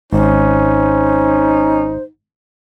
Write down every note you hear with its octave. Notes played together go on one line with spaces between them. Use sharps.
G#1 C#4 D#4 C5